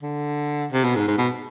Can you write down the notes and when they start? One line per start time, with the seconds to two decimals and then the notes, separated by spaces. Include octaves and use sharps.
0.02 D3
0.72 C3
0.84 B2
0.96 G#2
1.08 G#2
1.18 B2